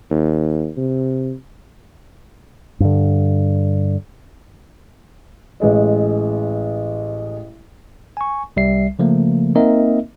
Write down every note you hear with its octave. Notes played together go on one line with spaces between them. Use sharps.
D#2
C3
G2 D3
A1 G#3 D#5
G#5 C#6
C2 G3 E5 C7
C#3 F3 A3 A#3
A#3 C4 D#4 A#4 D#5 E5